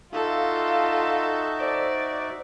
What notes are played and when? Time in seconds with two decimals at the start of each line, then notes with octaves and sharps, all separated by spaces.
0.13 D#4 F4 F#4 A4 E5 F5
1.60 C5 D5